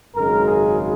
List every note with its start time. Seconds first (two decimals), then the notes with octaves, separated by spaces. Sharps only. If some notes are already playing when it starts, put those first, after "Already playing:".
0.15 G#1 F#2 C#3 G#3 A#4
0.46 G#4